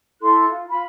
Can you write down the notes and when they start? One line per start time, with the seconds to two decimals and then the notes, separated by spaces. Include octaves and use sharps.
0.22 E4 A4 C6 F#6
0.50 F4
0.69 F4 B5